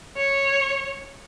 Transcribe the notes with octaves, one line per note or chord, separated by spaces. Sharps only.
C#5